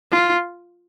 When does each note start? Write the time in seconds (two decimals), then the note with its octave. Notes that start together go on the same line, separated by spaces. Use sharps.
0.12 F4